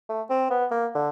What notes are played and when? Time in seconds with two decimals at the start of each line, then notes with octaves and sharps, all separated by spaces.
0.09 A3
0.30 C4
0.50 B3
0.71 A#3
0.95 D3